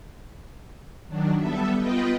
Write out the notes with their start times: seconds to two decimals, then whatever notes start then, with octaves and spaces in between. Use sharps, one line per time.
1.08 D#3 F#3 D4
1.37 G3 B3 A4 E5
1.78 B3 F4 B4 D#5 G5